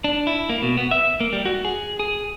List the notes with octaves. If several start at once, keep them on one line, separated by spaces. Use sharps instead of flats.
D4
E4
A#3
B2
B3
E5
A#3
G3
F#4
G#4
G#4